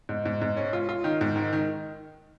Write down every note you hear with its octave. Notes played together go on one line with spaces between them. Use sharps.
G#2
G#2
G#2
C#4
F4
F4
D#3
G#2
D#3
D#3